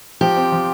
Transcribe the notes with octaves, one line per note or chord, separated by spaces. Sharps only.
F3 G4
C4
F3